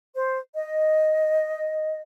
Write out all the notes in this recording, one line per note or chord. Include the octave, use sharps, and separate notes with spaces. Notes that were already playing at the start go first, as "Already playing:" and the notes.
C5
D#5